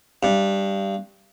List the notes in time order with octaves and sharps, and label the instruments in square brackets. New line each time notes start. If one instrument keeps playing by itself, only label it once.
[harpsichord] G2